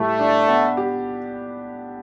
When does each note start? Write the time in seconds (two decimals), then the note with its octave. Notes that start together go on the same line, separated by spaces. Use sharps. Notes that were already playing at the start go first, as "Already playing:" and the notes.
Already playing: A2 G3 A3 G4
0.19 D4
0.48 B3
0.77 G4